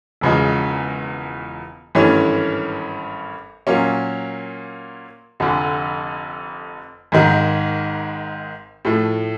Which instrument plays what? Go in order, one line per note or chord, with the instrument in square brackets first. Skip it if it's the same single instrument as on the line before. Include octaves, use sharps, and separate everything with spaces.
[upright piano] E1 E2 C#3 F3 G#3
G#1 G2 E3 A3 C#4
A#2 F#3 A#3 C#4
F1 F2 D3
G#1 G#2 D#3
A2 F3 A3